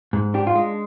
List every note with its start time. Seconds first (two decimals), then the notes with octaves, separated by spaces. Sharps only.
0.13 G#2
0.34 D4 G4
0.47 F4
0.55 G#3